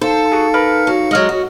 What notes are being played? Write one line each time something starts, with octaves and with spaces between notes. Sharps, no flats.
D#4 A4 C5 F5 C#7
F#4 G#4
A#4 B4
F#3
F#3 G#3 D#5 F6
F#4